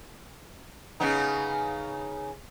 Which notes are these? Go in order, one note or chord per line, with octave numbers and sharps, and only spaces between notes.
C#3 B3 D#4